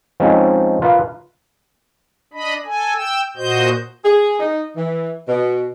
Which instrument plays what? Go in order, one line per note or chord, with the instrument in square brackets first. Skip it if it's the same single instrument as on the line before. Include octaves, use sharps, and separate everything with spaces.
[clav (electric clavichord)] F3 G#3 C4 C#4 D#4
F4 A#4 B4 F5
[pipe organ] D4 D#5 B5
A4 G#5
G5 E6
A#2 F#4 C5 D#5 G6
[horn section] G#4
D#4
E3
B2